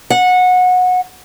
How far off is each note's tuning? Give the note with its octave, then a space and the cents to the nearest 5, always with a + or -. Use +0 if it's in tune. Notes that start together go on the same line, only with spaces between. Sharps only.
F#5 -20